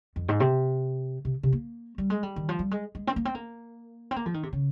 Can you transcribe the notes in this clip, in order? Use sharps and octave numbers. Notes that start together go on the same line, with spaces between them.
F2
G#2
C3
C3
C3
A#3
G3
G#3
G3
D#3
F3
G3
G#3
G#3
C4
A#3
C4
A#3
C4
A#3
F3
D#3
C3
C#3